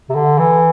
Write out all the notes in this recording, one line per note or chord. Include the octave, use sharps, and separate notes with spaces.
C3
D3
E3